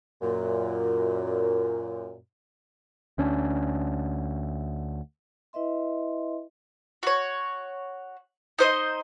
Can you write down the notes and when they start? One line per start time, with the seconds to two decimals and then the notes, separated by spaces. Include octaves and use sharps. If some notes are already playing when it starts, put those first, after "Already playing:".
0.22 F#2 A#2
3.18 D2 C#4 D4
5.53 E4 B4 D#5 E5 C6
7.03 F#4 C#5
8.59 D#4 C5 D#5